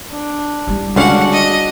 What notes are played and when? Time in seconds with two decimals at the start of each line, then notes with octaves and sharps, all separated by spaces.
0.11 D4
0.67 G3 E4
0.96 C#2 D3 C#4 D4 F#4 F#5
1.33 D#5